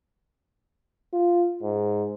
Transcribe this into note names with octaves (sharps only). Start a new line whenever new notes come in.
F4
G#2